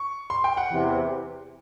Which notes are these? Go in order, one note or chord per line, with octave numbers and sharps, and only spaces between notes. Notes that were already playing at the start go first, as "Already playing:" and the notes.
Already playing: C#6
C6
G5
F#5
E2 C3 E3